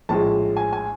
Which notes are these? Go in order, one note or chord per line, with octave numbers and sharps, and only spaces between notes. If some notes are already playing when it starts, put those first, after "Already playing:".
A#1 A2 F3 G#3 A5
G#5
G#5